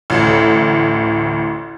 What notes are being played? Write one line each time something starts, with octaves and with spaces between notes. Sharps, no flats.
A1 D2